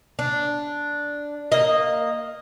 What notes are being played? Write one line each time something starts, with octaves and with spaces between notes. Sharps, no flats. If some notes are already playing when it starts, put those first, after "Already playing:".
D4
A#3 D#5